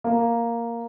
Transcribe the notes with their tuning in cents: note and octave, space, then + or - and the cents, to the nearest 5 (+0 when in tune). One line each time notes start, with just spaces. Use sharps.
A#3 +0